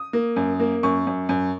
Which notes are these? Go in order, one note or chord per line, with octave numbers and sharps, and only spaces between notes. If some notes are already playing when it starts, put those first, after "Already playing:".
Already playing: D#6
A#3
F#2
A#3
F#2 C#6
F#2
F#2